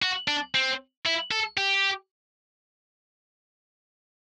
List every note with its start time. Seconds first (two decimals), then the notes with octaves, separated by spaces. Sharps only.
0.02 F#4
0.28 D4
0.55 C4
1.06 E4
1.31 A4
1.57 G4